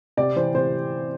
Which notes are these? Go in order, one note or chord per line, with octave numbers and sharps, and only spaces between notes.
C3 D5
E3 C5
C3 C5